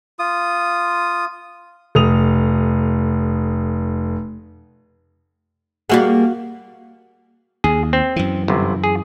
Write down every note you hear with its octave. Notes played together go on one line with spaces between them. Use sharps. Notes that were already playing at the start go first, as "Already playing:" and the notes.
F4 D#6
F1 D#6 F7
G3 A#3 F#4 G#4 F5 F#5
D#2 G#4
C4
F#2 E3
G1 C3
G#4